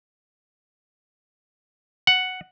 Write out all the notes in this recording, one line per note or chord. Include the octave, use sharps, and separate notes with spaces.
F#5